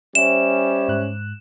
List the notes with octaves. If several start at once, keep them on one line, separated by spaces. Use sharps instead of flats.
G3 C#4 C5 E5 E7
G#2 F#6